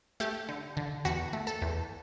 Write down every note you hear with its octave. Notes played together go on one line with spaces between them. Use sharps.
A3 G4
D3
D3
E2 F#4
A3
A4
E2